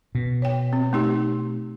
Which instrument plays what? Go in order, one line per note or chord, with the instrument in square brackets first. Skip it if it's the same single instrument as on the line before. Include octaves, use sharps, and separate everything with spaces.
[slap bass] B2
[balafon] C#5 G5
C4
A3 D#4 G4